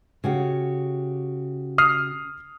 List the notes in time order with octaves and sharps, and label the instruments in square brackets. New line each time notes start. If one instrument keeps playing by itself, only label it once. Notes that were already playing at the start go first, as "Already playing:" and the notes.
[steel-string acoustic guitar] C#3 F#4 G4
[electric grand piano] D#6 F6 C7